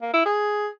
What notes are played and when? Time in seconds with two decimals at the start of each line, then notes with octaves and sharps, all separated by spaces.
0.02 A#3
0.14 E4
0.25 G#4